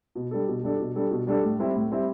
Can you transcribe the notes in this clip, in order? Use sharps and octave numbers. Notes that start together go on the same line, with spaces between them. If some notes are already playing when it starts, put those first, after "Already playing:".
B2
G3 D4 A4
B2
G3 D4 A4
B2
G3 D4 A4
B2
G3 D4 A4
A2
G3 C4 E4
A2
G3 C4 E4